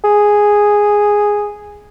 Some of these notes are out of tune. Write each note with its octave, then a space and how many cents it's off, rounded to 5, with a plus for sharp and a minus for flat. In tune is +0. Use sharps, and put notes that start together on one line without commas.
G#4 -5